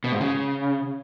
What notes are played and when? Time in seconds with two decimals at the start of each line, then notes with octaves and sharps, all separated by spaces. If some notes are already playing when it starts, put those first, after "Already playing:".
0.04 B2
0.12 G#2
0.21 C#3